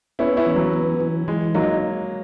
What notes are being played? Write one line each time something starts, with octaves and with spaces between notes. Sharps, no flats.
B3 C#4 E4
C#4 E4
E3
F#3
B3
E3
E3 G#3
F#3 A#3 D#4